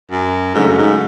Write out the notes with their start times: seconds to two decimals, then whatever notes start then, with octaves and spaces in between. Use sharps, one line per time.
0.12 F#2
0.54 G#2 C#3 F#3 A3 C#4
0.67 F#2
0.78 G#2